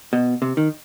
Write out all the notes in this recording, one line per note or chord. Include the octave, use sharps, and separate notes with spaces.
B2
C3
D#3